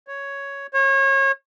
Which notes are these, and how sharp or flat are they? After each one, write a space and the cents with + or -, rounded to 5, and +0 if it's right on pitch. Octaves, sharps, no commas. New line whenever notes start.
C#5 +5
C#5 -30